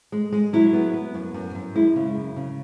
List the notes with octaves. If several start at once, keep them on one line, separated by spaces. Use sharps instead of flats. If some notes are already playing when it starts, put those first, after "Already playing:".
G#3
G#3
F#3 E4
B3
B3
F#2
F#2
F#2
G#3 E4
C#3
F#2
C#3